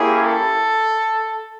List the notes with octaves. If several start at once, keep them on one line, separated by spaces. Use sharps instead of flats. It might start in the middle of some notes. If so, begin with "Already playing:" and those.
Already playing: A#3 C#4 E4 G4 G#4
A4